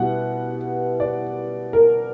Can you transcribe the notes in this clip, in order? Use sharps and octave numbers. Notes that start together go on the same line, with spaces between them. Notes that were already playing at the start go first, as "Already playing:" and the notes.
Already playing: B2 G3 B3 E4 F#5
D5
A#4